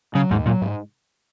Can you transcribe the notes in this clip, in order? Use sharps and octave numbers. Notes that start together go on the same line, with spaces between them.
C#3 F#3
D#2 G#2
A#2 F#3
G#2